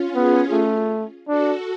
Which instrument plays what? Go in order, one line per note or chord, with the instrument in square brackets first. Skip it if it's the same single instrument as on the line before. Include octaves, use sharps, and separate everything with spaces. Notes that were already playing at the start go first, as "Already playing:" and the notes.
Already playing: [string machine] C#4 F4
[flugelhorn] B3 [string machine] F4 G#4
[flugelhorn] A3
[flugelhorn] D4 [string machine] F#4 A4